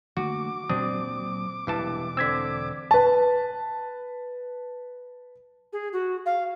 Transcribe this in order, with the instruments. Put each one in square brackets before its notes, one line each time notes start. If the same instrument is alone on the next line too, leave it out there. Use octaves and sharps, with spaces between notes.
[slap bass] D3 A3 A#3 [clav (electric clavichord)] F#4 [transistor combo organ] D6
[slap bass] D2 A#2 F#3 [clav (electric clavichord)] C4 D4 [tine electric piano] D#6
[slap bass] E1 [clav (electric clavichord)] G2 E3 A5
[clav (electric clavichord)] D3 C4 [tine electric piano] E6 G#6 B6
[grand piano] B4 A5
[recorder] G#4
F#4
F5